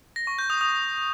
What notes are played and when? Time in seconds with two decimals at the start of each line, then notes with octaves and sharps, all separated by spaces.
0.16 A#6
0.27 C#6
0.39 G6
0.50 D#6
0.61 D#6